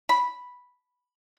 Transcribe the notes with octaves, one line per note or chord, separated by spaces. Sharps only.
B5